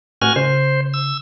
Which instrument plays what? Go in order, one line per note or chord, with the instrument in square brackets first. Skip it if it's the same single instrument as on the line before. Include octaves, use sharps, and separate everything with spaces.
[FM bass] A2 [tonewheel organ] F#4 G#5 F6
[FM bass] C#3 [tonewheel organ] C5
[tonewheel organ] E6